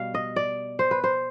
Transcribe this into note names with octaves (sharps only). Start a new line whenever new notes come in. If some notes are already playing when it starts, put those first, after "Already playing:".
Already playing: B2 G3 F5
D#5
D5
C5
B4
C5